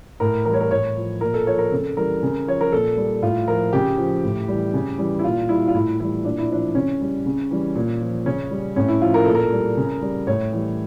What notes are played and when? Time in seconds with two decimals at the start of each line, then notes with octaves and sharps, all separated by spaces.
0.20 A2 A#4
0.45 E3 A#4
0.50 G3 C#5
0.61 A#4
0.71 A2 C#5
0.97 F3
1.21 A#2 A#4
1.34 A4
1.47 F3 C#5
1.58 A#4
1.71 C#3 A4
1.97 E3 G3 A#4
2.23 C#3
2.47 F3 C#5
2.61 A#4
2.72 A#2 A4
2.97 G3
3.22 A2 F4
3.48 F3 A#4
3.73 C#3 G4
3.98 F3
4.23 A2
4.48 E3 G3
4.74 C#3
4.98 E3 G3
5.19 E4
5.24 A#2 F4
5.49 G3 E4
5.68 F4
5.74 A2 E4
5.99 E3 G3 E4
6.25 A#2 D4
6.38 E4
6.50 F3 D4
6.75 C#3 C#4
7.01 G3
7.26 C#3
7.51 E3 G3
7.75 A#2
8.01 F3
8.26 C#3 C#4
8.51 G3
8.76 A2 C#4
8.88 E4
9.01 F3 F4
9.14 A#4
9.25 A#2 A4
9.35 A#4
9.52 G3
9.77 C#3
10.02 G3
10.27 A2 C#5
10.53 E3 G3